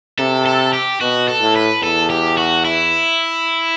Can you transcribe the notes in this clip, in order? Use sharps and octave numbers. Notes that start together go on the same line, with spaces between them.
C3 A4
A4
G4
B2 F#4
A4
A2
B4
E2 A4
G4
F#4
E4